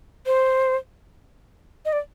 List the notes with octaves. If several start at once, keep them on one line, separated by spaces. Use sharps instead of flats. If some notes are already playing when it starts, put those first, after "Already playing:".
C5
D#5
D5